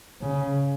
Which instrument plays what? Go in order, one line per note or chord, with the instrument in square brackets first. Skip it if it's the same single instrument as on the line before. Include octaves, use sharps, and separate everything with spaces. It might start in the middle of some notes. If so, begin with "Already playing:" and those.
[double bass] C#3